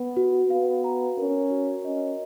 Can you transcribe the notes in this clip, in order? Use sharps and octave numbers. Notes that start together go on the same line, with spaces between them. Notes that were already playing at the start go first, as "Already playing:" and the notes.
Already playing: B3 B4
F#4
B3 F5
A#5
C#4 A#4
F#4
C#4 D#5